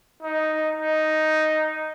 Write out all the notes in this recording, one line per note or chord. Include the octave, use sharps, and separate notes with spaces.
D#4
D#4